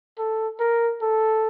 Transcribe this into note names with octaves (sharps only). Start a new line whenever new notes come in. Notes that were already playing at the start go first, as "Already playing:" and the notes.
A4
A#4
A4